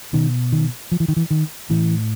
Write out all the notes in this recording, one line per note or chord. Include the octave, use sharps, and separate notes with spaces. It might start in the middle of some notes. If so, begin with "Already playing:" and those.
B2 D#3
D#3
F3
E3
D#3
E3
D#3
A2 E3